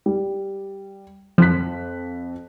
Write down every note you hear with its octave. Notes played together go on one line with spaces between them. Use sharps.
G3
F2 F3 F#6 B6